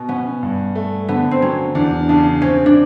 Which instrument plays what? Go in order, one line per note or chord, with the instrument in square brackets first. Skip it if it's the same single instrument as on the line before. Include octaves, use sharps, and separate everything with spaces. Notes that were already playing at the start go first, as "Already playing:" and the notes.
Already playing: [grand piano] B2
[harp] B3 [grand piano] C#4
[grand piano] G2
A3
[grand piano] D3 [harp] B3
[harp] C4
[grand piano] F#3 [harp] C#4
[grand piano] E2 [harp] D4
[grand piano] C#3 [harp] D4
[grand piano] C4 [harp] C#4
[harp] D4